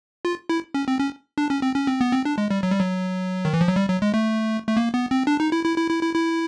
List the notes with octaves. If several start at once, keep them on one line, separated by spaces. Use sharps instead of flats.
F4
E4
C#4
C4
C#4
D4
C#4
C4
C#4
C4
B3
C4
D4
G#3
G3
F#3
G3
F#3
D#3
E3
F3
F#3
G3
F#3
G#3
A3
A3
A#3
B3
C4
D4
D#4
E4
E4
E4
E4
E4
E4